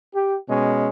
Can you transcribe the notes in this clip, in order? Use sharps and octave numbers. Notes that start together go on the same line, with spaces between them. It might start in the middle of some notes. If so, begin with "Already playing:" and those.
G4
B2 G#3 C#4